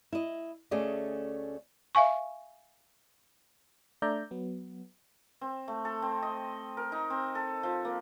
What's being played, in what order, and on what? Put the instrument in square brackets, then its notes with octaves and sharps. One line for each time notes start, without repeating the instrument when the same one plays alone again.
[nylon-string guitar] E4 D#5
D2 A3 C#4 G#4 D5 D#5
[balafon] E5 F5 G#5 C#6
[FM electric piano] A3 D4 D5 E5 A#5 G6
F#3 B3
[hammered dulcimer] C4
A3
A4
C4
D#5
A#4
D#4
C4
A4
F3
A#3